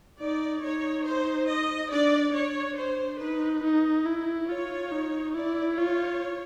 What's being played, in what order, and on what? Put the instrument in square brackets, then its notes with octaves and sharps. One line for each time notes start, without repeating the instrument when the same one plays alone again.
[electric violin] D#4 [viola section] D5
[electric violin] D#4 [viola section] C#5
[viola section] C5
D#5
[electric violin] D4 [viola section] D5
[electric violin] D4 [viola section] C#5
[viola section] C5
[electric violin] D#4 [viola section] B4
[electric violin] D#4
E4
[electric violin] F4 [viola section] C#5
[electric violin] D#4
[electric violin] E4 [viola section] D5
[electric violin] F4 [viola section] C#5